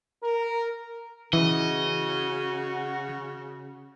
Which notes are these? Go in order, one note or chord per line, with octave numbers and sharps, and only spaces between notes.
A#4
C#3 E3 F#4 D#5